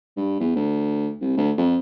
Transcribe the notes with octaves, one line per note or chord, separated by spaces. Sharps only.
G2
E2
D2
C2
D2
F2